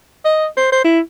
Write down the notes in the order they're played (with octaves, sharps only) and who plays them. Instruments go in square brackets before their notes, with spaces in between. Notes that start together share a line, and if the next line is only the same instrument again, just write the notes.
[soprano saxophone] D#5
C5
C5
E4